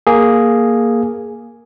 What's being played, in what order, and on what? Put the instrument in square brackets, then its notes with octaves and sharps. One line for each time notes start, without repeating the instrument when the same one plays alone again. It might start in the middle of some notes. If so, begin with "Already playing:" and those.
[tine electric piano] A#3 G#4